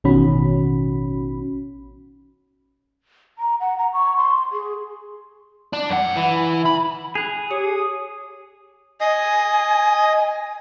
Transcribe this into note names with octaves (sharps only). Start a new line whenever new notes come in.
A1 B2 D#3 C#4 F#4 B5
A#5
F#5
A#5
C#6
C6
G#4
D4
F#2 F#5
E3
B5
G#4 F#6 F7
G4 C#5 D#6 C#7
D#5 G#5